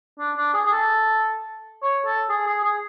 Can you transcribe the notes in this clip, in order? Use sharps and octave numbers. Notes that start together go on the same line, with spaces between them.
D4
D4
G#4
G#4
A4
C#5
A4
G#4
G#4
G#4